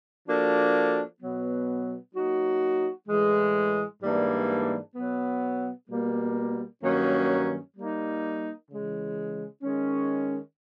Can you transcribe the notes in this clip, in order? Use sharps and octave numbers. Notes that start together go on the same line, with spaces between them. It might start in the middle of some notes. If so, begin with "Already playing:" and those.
F3 A#3 D4 F#4 A4
B2 F#3 B3
F#3 A#3 D#4 F#4
A2 E3 G#3
G#2 E3 G3 A#3 D4
B2 F#3 B3
B2 G3 A#3
G2 D#3 F#3 A#3 C#4
G3 A#3 D#4
C#3 E3 G#3
D#3 G#3 C#4